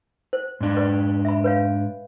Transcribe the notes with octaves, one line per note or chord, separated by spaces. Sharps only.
C5
G#2 D4
B4 D5
E5 B5
B4 C#5 F5